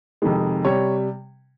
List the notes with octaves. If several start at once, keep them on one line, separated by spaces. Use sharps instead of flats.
F2 C3 D#3 G#3
C3 G3 C#5